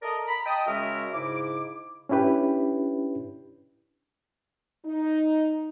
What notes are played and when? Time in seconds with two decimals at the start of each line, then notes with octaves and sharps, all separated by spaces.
0.02 A4 A#4 D5 D#5 A#5
0.27 A#5 B5
0.45 D#5 G5 A5 D#6
0.67 C#3 G#3 F#4 A#4 E5
1.13 G#2 C#3 E4 D6
2.09 C#4 D4 E4 G4 B4
4.85 D#4